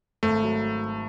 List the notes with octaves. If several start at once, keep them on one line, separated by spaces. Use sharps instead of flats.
G#1 A3
F#3